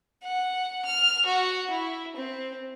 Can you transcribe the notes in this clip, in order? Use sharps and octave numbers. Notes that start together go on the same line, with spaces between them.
F#5
F6
F#4
E4
C4